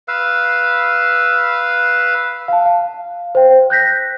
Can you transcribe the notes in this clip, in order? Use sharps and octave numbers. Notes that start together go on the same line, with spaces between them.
B4 F5 E6
F5 A5
F5
C5 G5
F#6 G6 A#6 B6